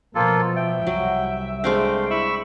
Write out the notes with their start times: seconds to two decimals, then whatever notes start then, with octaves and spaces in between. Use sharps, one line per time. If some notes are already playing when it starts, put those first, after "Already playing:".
0.15 B2 F3 A#3 F4 A4
0.56 E5 G5
0.86 C2 F#3
1.64 G#3 A3 C4 D4 F5 G5
2.11 E4 B5 C#6 E6